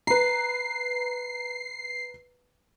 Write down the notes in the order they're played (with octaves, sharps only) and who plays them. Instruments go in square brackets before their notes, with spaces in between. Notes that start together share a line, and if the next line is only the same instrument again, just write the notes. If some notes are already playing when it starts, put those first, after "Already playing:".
[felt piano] B4 A#5 [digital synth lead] C7